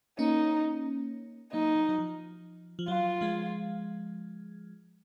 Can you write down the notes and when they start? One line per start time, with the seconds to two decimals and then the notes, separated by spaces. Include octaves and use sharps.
0.19 A#3 C#4 D#4
1.53 F#3 A#3 D#4
1.76 F#3
1.89 F#3
1.98 F3
2.79 F3
2.88 F#3 F4
3.21 F3 G#3